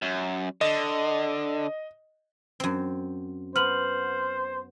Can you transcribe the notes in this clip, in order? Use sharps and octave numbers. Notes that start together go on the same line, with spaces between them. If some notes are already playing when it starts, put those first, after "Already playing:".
F#2
D3 D#5
F#2 C4
B3 C5 F6 F#7